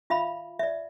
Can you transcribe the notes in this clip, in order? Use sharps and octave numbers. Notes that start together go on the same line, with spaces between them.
F4 E5 F5 B5
D5 E5